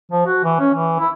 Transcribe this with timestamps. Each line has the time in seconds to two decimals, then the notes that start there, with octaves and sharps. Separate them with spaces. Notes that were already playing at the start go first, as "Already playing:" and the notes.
0.12 F3
0.26 F#4
0.44 E3
0.60 C#4
0.74 E3
0.99 E4